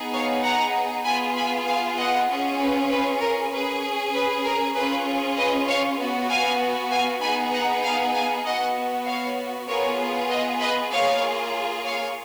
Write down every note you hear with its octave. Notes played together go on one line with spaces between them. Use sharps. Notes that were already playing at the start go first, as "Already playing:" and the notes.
Already playing: B3 D#4 G#4
C#5 F5
F#5 A#5
B3 F4 G#4 G#5 B5
G#5 B5
F5 G#5
D#5 F#5
C#4 F4 G#4
B4
B4
A#4
C#4 G#4 B4
B4
A#4
C#4 F4 G#4 B4
B4 D#5
C#5 F5
B3 F#4
F5 G#5
F5 G#5
B3 D#4 G#4 G#5 B5
F#5 A#5
F5 G#5
F5 G#5
B3 F#4 D#5 F#5
C#5 F5
B3 F4 G#4 A#4 C#5
B4 D#5
B4 D#5
A#3 F4 G#4 C#5 F5
C#5 F5